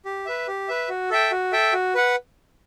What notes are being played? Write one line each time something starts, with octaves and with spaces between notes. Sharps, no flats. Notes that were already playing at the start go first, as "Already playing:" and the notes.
G4
B4 E5
G4
B4 E5
F#4
A4 E5 G5
F#4
A4 E5 G5
F#4
B4 F#5